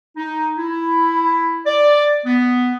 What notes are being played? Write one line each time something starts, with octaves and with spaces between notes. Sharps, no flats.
D#4
E4
D5
B3